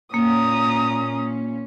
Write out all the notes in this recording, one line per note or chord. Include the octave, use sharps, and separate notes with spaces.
A#2 A#3 C#4 A#5 D#6